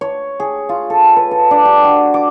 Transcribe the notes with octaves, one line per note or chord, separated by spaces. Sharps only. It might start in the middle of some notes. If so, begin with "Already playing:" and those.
C#5
G#4
F4
A4
B4
A4
D4
G4
F#4
D6